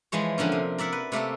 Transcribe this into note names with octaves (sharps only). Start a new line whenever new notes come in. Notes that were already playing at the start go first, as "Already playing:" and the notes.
E3 F3 G#3 C#5
D3 F3 A#3 C#4
C3
A#4 D5 E5 F#5
B4
C3 A3 A#3 A4